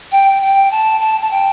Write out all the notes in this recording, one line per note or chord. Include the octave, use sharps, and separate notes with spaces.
G5
G5
A5
A5
A5
G5